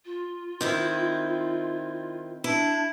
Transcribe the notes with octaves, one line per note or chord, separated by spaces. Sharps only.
F4
D#3 C4 E4
D4 E4